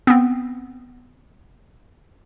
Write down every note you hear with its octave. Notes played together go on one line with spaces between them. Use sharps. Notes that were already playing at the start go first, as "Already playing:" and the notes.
B3 C4